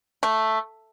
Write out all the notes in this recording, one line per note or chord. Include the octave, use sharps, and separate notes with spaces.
A3